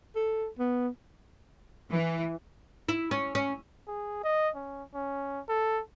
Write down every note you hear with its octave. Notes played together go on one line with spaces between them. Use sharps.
A4
B3
E3
E4
C#4
C#4
G#4
D#5
C#4
C#4
A4